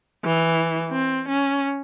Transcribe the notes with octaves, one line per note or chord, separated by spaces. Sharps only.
E3
C4
C#4